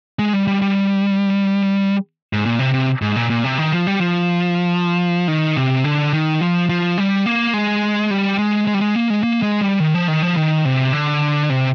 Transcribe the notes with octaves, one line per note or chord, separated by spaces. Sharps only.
G#3
G3
G3
G3
G#2
A#2
C3
C3
G#2
A#2
A#2
C3
D#3
F3
G3
F3
D#3
C3
D3
D#3
F3
F3
G3
A#3
G#3
G3
G#3
G#3
G3
G#3
A#3
G#3
A#3
G#3
G3
D#3
F3
D#3
F3
D#3
C3
D3
C3